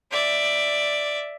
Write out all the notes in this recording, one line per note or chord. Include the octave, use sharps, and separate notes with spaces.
D5 E5